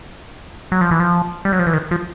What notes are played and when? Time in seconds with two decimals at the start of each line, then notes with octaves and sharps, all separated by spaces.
0.72 F#3
0.81 F3
0.91 E3
1.00 F3
1.45 G3
1.52 F#3
1.59 F3
1.67 E3
1.73 D#3
1.91 F3